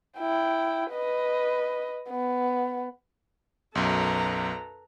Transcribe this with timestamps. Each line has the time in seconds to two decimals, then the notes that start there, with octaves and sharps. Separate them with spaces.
0.19 E4 G5
0.92 B4 D#5
2.09 B3
3.75 B1 F#2 A4 B4 A#5